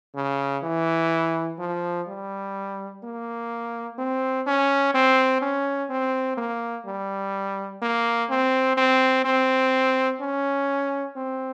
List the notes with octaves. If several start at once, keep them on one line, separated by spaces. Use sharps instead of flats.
C#3
E3
F3
G3
A#3
C4
C#4
C4
C#4
C4
A#3
G3
A#3
C4
C4
C4
C#4
C4